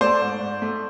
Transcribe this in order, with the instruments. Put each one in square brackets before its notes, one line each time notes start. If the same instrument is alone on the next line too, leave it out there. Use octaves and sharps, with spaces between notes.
[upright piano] A3 C5 D5
G#2
G#2
A3